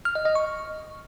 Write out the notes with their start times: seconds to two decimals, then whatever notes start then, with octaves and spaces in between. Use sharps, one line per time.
0.05 F6
0.15 D#5
0.25 D#5
0.35 C#6